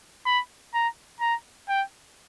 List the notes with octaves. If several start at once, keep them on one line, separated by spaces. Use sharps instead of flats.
B5
A#5
A#5
G5